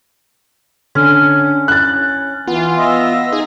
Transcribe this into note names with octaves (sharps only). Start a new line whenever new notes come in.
D3 C#4
F#6 A6
E3 B3 F4
D#5 E5
D#4 G#4